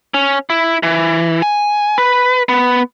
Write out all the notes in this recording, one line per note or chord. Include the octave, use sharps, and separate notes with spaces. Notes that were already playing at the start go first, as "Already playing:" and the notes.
C#4
E4
E3
G#5
B4
B3